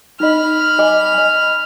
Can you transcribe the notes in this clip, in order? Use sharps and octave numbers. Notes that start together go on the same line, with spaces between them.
D#4 D#5 B5 F6
D#5 G#5 D6
D#5 G#5